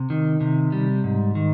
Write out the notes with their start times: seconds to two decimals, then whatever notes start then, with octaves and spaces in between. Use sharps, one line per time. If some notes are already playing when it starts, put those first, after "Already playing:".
Already playing: C3
0.10 D#3
0.41 C3
0.72 G3
1.04 G#2
1.35 D#3